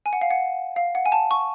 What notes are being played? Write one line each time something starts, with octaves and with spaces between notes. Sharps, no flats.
G#5
F#5
F5
F#5
F5
F#5
G#5
A5
C#6